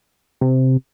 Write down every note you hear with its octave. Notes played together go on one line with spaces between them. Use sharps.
C3